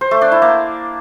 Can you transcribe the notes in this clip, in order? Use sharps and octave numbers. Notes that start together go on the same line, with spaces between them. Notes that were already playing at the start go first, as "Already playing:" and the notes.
C5
A3
D4
E4
A#3